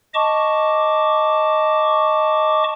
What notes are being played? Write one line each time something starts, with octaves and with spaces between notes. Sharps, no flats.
D#5 A5 C#6 D6